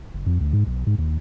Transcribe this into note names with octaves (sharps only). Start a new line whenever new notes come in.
F#1
F2
D2
G#2
B1
G#2
D#2